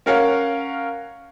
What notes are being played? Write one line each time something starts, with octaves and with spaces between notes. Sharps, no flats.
C#4 A#4 C#5 F5 F#5